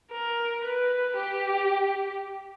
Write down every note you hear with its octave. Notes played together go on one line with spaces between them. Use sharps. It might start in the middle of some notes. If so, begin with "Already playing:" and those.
A#4
B4
G4